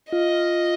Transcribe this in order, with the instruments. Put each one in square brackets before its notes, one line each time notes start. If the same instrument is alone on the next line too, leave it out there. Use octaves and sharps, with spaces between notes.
[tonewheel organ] F4 [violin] D#5